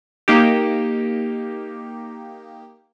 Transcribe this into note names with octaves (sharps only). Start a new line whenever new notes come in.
A#3 D#4 G4